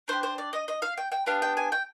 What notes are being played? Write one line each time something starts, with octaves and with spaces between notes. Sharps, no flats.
D4 G4 C5
C5
D5
D#5
D#5
F5
G5
G5
B3 D4 G4 F5
G5
G#5
G5